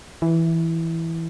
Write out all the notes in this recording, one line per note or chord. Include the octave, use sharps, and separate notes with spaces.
E3